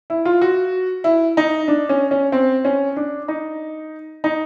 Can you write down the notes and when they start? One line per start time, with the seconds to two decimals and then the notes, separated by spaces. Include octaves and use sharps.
0.10 E4
0.25 F4
0.42 F#4
1.04 E4
1.37 D#4
1.68 D4
1.89 C#4
2.11 C#4
2.32 C4
2.65 C#4
2.96 D4
3.28 D#4
4.24 D#4